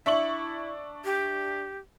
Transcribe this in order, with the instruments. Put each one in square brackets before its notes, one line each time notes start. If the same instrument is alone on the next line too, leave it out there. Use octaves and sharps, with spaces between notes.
[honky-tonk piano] D4 C#6 F#7 [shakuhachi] E4 [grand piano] E5
[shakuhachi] G4